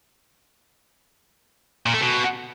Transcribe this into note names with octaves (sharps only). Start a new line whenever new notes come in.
A#2
A3
B2